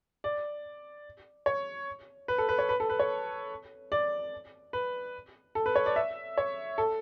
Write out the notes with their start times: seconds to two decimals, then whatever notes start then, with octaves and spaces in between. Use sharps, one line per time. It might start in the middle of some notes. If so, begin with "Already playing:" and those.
0.24 D5
1.46 C#5
2.28 B4
2.38 A4
2.49 B4
2.58 C#5
2.69 B4
2.80 A4
2.90 B4
2.99 C#5
3.92 D5
4.73 B4
5.55 A4
5.66 B4
5.76 C#5
5.86 D5
5.96 E5
6.38 C#5
6.78 A4